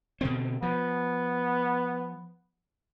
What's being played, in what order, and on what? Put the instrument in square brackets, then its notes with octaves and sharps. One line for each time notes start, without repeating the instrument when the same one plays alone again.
[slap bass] B2 D3 C4
[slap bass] F3 [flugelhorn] B3